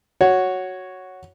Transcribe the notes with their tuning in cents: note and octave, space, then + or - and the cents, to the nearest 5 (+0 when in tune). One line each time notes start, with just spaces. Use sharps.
F#4 +0 C#5 +0